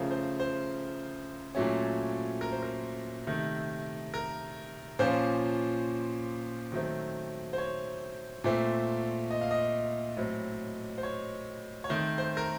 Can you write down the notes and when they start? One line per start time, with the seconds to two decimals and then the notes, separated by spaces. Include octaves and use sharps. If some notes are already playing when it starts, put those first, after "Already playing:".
Already playing: C#3 F3 A3 A#4
0.11 C5
0.40 C5
1.55 A#2 F#3 A3 C#4
2.41 A#4
2.52 C5
2.63 A#4
3.27 C3 D#3 A3
4.14 A#4
4.99 A#2 F3 A#3 C#4 C5
6.72 D#3 F#3 A3 C4
7.53 C5
7.58 C#5
8.44 A#2 A3 C4
9.31 D#5
9.41 F5
9.51 D#5
10.17 A2 F#3 C4
10.98 C5
11.03 C#5
11.84 C#5
11.90 D#3 A3 C4 C5
12.18 C5
12.37 A#4